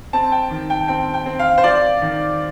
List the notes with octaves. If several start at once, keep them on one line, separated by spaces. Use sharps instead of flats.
C4 A5
G5
D#3
G5
C4 G5
G5
C4
F5
C5
F4 D5
D#3